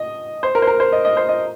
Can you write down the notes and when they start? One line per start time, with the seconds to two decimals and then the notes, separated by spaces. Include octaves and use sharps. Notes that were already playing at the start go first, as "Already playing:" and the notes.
Already playing: D#5
0.43 C5
0.55 A#4
0.62 C5
0.67 A#4
0.80 C5
0.92 D#5
1.05 D#5
1.17 C5
1.29 D#5